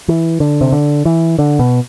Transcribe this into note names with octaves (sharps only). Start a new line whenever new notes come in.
E3
D3
C3
D3
E3
D3
B2